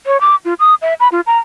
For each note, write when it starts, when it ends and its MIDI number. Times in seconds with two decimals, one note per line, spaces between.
0.06 0.20 73
0.21 0.36 86
0.45 0.54 65
0.60 0.75 87
0.82 0.94 76
1.00 1.08 83
1.12 1.21 65
1.26 1.38 82